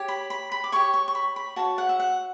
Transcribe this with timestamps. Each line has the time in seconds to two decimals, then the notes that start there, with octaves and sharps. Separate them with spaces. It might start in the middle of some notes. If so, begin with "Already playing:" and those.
Already playing: G4 C#5
0.08 B5
0.30 B5
0.52 B5
0.64 D6
0.72 G4 C#5 C#6
0.94 C#6
1.08 C#6
1.15 B5
1.36 B5
1.56 F#4 C#5 A5
1.78 F#5
1.89 E5
2.00 F#5